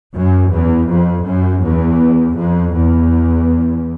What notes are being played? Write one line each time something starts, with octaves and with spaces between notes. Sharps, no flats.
F#2
E2
F2
F#2
E2
F2
E2